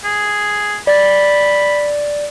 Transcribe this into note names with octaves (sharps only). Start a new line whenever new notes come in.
G#4
D5 B5 A6